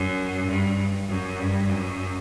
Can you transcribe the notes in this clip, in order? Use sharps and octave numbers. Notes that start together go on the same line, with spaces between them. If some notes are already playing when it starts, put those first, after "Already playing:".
Already playing: F#2
G2
F#2
G2
F#2